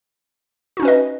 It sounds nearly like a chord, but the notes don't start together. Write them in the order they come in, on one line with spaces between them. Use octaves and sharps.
F#4 D#4 C#4 B4 D#5